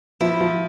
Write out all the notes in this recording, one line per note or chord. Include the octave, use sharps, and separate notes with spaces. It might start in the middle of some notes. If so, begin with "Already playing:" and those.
F3 E4
F3